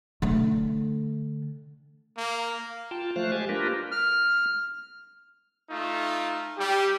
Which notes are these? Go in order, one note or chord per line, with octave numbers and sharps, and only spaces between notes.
D3 A3
A#3
F4 G5 A5
F3 A3 C5 F5 F#6
G#3 G4 G#5 A5
A#3 D4 F4 G4 A#4 B4
F6
A3 D#4 F4
G3 G4